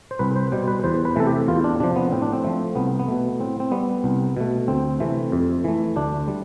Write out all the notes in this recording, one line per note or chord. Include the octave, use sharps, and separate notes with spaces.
C5
C2 B4
C5
B2 G3 C5
B4
E2 C5
B4
C3 E3 A3 A4
G4
E2 F4
D4
C3 F3 D4
B3
A2 C4
D4
C4
F3 A3
C2 B3
B3
B2 A3
A2 C4
C4
G3 B3
C2
B2 A3
D2 C4
C3 E3 A3
F2
E3 A3
D2 D4
G3